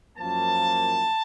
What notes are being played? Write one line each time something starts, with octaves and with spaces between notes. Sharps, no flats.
F#2 F3 A#3 A5